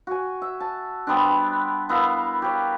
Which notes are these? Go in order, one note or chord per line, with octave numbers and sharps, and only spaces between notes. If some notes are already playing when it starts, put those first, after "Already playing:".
F#4 G#5
E5
A5
G3 B3 C4 D4
B3 E4 A#4 F5
G4 C#5